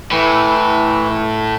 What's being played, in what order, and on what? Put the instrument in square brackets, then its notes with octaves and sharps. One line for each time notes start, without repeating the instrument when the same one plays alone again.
[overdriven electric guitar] A2 [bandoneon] E3